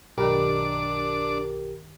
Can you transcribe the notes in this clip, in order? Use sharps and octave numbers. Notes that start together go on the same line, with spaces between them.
B1 G2 D#3 D4 G4 A#4 D6